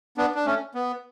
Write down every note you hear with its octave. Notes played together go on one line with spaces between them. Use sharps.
B3 D4
D4
A3 C#4
B3